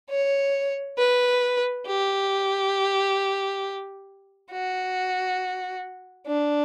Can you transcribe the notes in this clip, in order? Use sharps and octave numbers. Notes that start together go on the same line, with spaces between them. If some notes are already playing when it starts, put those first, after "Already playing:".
C#5
B4
G4
F#4
D4